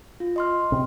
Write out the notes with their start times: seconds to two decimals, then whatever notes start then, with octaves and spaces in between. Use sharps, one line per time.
0.20 F4
0.36 D#5 C6 F6
0.72 C3